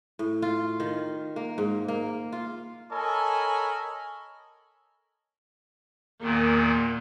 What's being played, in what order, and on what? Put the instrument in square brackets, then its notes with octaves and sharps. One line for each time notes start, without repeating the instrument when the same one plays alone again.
[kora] A2
F4
D#3
A#3
G#2
A#3
F4
[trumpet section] A4 A#4 C#5 D#5 G#5 B5
[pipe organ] E2 A#2 D#3 [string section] A#3